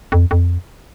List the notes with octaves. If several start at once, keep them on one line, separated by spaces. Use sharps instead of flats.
F2
F2